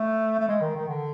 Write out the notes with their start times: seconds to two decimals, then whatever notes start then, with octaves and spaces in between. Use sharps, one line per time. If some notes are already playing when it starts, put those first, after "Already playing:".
Already playing: A3
0.40 A3
0.49 G#3
0.61 D#3
0.76 D#3
0.88 D3